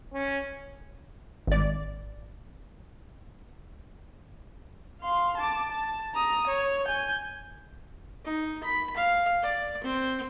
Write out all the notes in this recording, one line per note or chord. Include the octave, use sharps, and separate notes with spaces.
C#4
G#1 D5
F5 C6
A5 D6
A5
A#5 D#6
C#5
G#5 G6
D#4
B5
F5
D5
C4